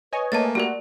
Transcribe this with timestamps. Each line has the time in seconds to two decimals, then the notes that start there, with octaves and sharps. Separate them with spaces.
0.13 B4 C#5 D#5 G#5
0.32 A3 A#3 A5 A6
0.55 G3 F#4 G4 A#4 D5